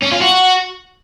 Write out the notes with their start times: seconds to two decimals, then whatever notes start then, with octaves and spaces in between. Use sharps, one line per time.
0.03 C#4
0.12 F4
0.22 F#4